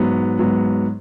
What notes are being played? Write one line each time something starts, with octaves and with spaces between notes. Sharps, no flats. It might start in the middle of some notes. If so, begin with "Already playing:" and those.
Already playing: G#2 F#3 B3
G#2 F#3 B3